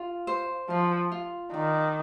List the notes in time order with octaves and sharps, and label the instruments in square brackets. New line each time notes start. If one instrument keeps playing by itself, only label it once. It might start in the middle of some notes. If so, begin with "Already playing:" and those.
Already playing: [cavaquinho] F4
C5
[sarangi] F3 [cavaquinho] F4
[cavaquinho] F4
[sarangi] D#3 [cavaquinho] D5